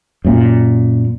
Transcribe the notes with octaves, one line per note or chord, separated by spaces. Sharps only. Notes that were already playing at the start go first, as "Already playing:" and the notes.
F#2 A#2